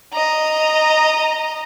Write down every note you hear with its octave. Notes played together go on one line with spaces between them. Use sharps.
D#5 A#5